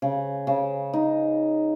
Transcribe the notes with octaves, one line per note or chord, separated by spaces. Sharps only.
C#3
C#3
D#4